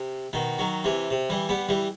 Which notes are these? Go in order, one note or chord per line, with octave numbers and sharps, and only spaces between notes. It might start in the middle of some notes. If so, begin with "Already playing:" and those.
Already playing: C3
B2 D#3
D#3 F#3
C3 E3
C3
E3 G3
G3 B3
E3 G3